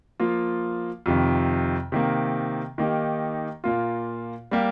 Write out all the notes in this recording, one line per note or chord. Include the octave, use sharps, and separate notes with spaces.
F3 A#3 F4
F2 C3 D#3
C3 D#3 A#3
D#3 A#3 D#4 G4
A#2 A#3 F4
G3 A#3 G4